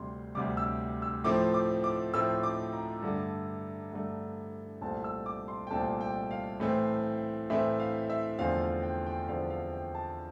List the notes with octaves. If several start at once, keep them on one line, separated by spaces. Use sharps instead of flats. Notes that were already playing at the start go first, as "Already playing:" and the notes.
Already playing: D2 C3 G3 C6
D2 C3 G3 D6
E6
E6
A2 F3 A3 C4 D6
D6
D6
A2 F3 A3 C4 E6
D6
A#5
G2 D3 A3
G2 D3 A3
C2 A#2 A3 C4 A5
E6
D6
C6
G5
C2 A#2 A3 C4 A5
G5
F5
A2 E3 A3 C4
A2 E3 A3 C4 E5
F5
E5
E2 D3 F3 A3 C4 F5
F5
G5
G5
E2 D3 F3 A3 C4 F5
F5
G5
A5